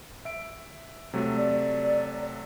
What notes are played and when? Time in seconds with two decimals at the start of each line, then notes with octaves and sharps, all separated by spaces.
0.25 E5 D7
1.13 C3 F#3 A3
1.37 D5